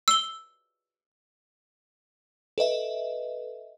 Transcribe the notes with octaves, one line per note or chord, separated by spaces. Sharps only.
E6 G7
A4 B4 D#5 E5